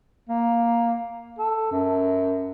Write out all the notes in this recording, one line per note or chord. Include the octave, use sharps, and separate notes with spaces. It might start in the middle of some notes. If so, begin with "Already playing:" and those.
A#3
A4
F#2